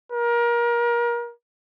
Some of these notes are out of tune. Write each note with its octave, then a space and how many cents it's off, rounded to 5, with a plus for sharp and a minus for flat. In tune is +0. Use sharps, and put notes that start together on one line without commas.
A#4 +30